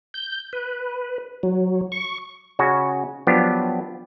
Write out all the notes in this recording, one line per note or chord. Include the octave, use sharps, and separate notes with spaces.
G6
B4
F#3
C#6
C#3 C#4 F#4
F3 F#3 B3 D4 G4